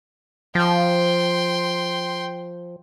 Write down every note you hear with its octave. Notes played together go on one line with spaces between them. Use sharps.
F3 G5 C6